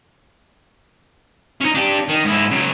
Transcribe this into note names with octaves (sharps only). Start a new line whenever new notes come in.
C#4 D#4
D4 G4
D#3
G#2 E4
C#3 F#3